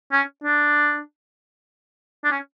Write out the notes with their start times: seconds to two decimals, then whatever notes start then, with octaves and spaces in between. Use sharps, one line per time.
0.12 C#4
0.44 D4
2.24 D4
2.31 C#4